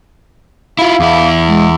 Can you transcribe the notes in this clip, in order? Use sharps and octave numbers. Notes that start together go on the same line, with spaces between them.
E4 F4 F5
E2 E4
G#3